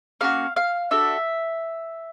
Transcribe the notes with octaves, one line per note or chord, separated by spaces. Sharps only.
A#3 C#4 F#4 F5
F5
D4 F#4 A4 E5